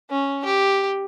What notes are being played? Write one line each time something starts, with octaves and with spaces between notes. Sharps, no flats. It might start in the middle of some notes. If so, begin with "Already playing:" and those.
C#4
G4